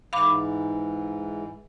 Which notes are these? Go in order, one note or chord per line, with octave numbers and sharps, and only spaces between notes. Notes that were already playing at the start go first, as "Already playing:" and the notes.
G#2 E3 F5 B5 D6